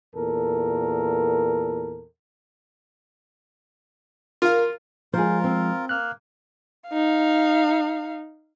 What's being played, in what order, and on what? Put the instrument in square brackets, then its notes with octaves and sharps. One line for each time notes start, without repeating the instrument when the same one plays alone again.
[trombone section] E2 A#2 A4 A#4
[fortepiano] F4 [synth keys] A#4 F5
[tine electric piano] F3 G#3 [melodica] F4 A#4 [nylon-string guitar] G#4 C5
[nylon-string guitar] C4
[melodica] A#3 [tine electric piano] F6 F#6
[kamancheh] D#4 F5